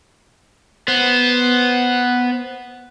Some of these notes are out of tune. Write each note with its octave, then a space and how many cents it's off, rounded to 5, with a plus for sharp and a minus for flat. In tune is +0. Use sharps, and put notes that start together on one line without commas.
B3 +0 C5 +0